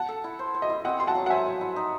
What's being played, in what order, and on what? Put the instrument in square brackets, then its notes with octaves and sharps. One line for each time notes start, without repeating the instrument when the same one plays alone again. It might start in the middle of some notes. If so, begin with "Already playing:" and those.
Already playing: [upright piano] F#5 A5
[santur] A4
E4
C5
C5
[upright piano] D#5
[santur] E4
[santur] C4 [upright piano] D#5 F#5
[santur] E4 [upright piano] C6
[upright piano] F#5 A5
[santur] F#3
[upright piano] F#5
[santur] C5 [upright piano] E5 G#5
[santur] C5
E4
D#4